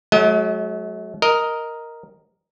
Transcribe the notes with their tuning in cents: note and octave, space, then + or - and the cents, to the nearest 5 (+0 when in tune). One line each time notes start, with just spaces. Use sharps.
F#3 +0 A3 -45 D#5 +35
A#4 +0 D#5 +5